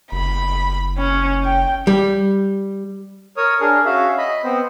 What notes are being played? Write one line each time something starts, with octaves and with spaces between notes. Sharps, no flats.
F#1 B5
C#4
G5
G3
A#4 C#5 D#6
D4 G#4 A#4
C#4 F#4 G#4 E5 F5
D#5 B5
B3 C4 C5